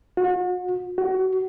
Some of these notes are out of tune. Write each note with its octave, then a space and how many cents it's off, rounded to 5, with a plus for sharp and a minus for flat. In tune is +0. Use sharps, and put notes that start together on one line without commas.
F#4 -40
F#4 +25